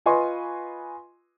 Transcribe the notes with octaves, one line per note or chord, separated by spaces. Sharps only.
F4 B4 D#5 G#5 C6 C#6